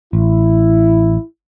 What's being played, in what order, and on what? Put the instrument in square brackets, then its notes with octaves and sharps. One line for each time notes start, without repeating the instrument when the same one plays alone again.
[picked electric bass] A1 [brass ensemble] E4